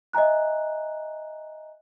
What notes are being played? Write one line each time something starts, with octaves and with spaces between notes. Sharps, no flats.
D#5 E5 G#5 A#5 F#6